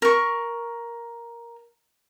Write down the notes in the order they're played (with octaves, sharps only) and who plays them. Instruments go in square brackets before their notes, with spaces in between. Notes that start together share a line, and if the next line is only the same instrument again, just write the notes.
[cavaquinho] A#4 C#6